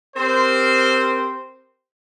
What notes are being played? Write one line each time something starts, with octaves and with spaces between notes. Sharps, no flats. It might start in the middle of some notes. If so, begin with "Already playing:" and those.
C4 G4 A#4 C5